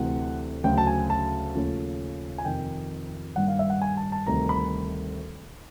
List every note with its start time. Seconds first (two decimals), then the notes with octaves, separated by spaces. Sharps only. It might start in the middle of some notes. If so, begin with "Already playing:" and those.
Already playing: D2 C3 E3 F#5
0.64 D2 C#3 F#3 G5
0.78 A5
0.87 G#5
1.10 A5
1.55 D#2 C#3 F3 A3 C#4
2.38 G#5
2.45 F2 C3 D#3 G5
3.36 G2 D#3 G3 A#3 F#5
3.48 F5
3.59 E5
3.70 F#5
3.82 G#5
3.97 A5
4.12 A5
4.26 D2 C3 D#3 G3 A#5
4.49 B5